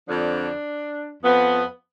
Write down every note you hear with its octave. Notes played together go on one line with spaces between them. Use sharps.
F2 D3 F3 D4
F2 F3 B3